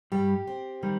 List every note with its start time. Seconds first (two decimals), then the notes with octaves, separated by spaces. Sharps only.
0.12 G2 G3 G4
0.47 C4
0.83 D#3 G3